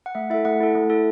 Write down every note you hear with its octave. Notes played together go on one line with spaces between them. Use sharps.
F#5
A3 E5
E4 A4 E5
A3 F#5
E4 A4
A3
E4 A4